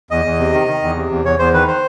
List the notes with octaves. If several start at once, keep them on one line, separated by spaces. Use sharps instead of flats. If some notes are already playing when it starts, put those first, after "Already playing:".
E2 D#5
E2
C3
D#3
D#3
E2
C3
E2
E2 C#5
E2 C5
D#3 B4
C5